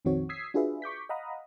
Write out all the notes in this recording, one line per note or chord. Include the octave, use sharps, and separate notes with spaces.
A#1 F2 D#3 C4 F#4 C#5
D#6 E6 G#6 B6 C7
D4 F4 F#4 G#4 B4 E5
C#6 D6 G6 B6
D#5 F5 F#5 A#5 B5 D#6